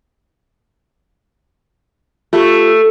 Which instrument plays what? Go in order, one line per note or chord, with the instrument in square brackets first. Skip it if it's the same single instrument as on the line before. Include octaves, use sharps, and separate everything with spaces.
[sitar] A3 [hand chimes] F4 G4